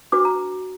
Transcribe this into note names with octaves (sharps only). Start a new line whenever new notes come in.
D4 F#4 B4 D6
A#5